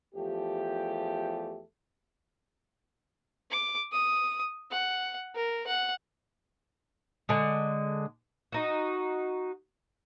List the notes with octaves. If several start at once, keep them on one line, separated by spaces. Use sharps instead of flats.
E2 F3 A3 G4
D6
D#6
F#5
A#4
F#5
D3 G#3
D#4 F#4